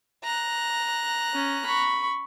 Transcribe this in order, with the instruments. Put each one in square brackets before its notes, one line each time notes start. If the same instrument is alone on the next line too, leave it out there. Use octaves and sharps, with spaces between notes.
[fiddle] A#5 F#6
[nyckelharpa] C#4
B5 C#6